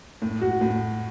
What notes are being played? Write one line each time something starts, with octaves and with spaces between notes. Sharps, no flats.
A2
F#4
A2